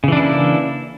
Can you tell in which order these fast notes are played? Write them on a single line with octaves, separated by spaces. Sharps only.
C#3 E3 D4 E4 A#3